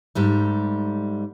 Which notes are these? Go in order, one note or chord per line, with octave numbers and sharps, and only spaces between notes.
G#2 G3 A3